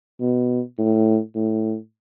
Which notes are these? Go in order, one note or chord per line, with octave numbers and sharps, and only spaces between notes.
B2
A2
A2